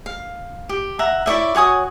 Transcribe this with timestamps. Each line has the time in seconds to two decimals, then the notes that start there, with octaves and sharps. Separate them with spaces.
0.06 F5
0.69 G4
0.99 E5 F#5 A#5
1.26 E4 C#5 D5 E5
1.55 F#4 C#5 G#5 D#6